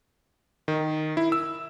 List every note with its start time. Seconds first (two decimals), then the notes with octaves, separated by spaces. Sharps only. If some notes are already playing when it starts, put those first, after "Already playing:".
0.68 D#3
1.17 E4
1.32 E6